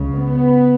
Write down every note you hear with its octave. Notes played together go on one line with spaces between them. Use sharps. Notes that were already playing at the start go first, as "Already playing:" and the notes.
Already playing: C#2 C#3
B3